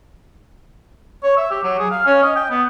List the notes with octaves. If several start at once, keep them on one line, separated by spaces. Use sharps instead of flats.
C#5
E5
G4
F#3
G#4
F5
C#4
D#5
G5
B3